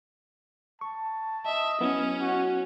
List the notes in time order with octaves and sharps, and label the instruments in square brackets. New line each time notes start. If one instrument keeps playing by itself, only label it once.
[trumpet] A5 [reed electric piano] C#6
[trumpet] D#5 [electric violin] E5
[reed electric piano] F#3 B3 E4 [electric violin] C#4
[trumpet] F#4